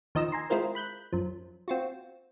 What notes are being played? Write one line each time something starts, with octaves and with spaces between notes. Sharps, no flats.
D#2 F3 D#4 D#5 E6
G#5 A#5 C6
G#3 C4 E4 F4 A#4 C5
B5 F#6 G6
F#2 F3
C4 F4 F#4